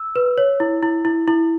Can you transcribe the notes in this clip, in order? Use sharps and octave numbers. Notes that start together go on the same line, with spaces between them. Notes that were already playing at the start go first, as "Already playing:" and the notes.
Already playing: E6
B4
C#5
E4
E4
E4
E4